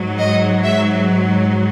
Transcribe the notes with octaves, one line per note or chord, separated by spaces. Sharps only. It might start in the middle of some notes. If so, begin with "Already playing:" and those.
Already playing: G#2 F#3
D#5
E5